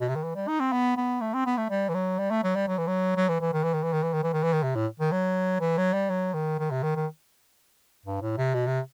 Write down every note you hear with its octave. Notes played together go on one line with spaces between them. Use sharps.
B2
C3
D#3
E3
G3
D#4
C4
B3
B3
A3
C4
B3
A3
G3
E3
F#3
G3
A3
F#3
G3
F#3
E3
F#3
F#3
E3
E3
D#3
E3
D#3
E3
D#3
E3
D#3
E3
D#3
E3
D#3
C3
A2
D#3
F#3
E3
F#3
G3
F#3
D#3
D#3
C3
D#3
D#3
G2
A2
C3
B2
C3